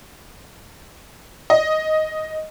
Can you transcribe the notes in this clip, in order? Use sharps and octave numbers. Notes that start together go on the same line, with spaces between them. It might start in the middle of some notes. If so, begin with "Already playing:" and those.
D#5